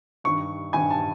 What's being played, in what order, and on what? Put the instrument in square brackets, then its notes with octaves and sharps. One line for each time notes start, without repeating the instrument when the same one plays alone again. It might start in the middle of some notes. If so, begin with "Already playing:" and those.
[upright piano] G2 D#3 C#6
G2 D#3 G#5
A5